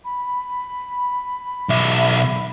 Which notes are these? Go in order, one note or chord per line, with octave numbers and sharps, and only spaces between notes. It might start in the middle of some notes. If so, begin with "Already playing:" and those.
B5
B1 E5